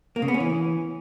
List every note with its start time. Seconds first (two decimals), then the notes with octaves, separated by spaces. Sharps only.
0.16 A#3
0.22 C#3
0.28 B3
0.34 C#4
0.40 E3